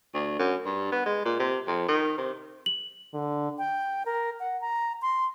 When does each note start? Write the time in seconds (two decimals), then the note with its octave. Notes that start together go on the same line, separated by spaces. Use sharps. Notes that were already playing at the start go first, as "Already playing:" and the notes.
0.14 D2
0.39 F#2
0.65 G2
0.92 B3
1.06 G#3
1.25 A#2
1.40 C3
1.67 F2
1.89 D#3
2.18 C3
2.66 F#7
3.14 D3
3.58 G5
4.05 A#4
4.40 F#5
4.61 A#5
5.02 C6